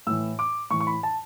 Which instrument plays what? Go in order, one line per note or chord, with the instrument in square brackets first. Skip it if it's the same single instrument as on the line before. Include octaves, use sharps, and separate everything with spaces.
[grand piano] A2 E3 E6
D6
A2 E3 C#6
C#6
B5
A5